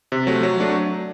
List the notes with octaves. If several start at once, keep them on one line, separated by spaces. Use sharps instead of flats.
C3
F#3 A3
F#3
A3 D4 F#4